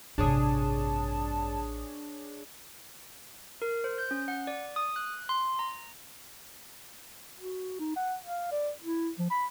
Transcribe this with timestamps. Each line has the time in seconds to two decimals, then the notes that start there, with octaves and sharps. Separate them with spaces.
0.18 A1 G2 C3 D4 G#4 C#5 A5 D#6
3.62 A#4
3.84 C5
3.98 G6
4.11 C#4
4.28 F#5
4.47 D5
4.76 D#6
4.96 F#6
5.29 C6
5.59 A#5
7.38 F#4
7.80 D#4
7.96 F#5
8.23 F5
8.52 D5
8.82 E4
9.19 F3
9.30 B5